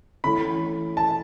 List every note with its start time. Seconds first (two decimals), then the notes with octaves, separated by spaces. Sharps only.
0.24 E3 A3 C#4 B5
0.97 A5